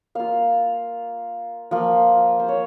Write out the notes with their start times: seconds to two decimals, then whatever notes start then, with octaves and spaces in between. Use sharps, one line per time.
0.15 A#3 F4 F5
1.71 F3 A#3 F4
2.40 C5
2.49 C#5